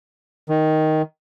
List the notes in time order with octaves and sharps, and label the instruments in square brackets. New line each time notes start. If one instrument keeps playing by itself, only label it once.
[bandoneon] D#3